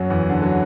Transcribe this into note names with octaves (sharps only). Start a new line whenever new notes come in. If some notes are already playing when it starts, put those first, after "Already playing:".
Already playing: F#2 F#3
E2 E3
D3
F#3